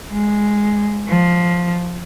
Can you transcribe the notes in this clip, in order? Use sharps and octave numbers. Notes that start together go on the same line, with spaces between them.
G#3
F3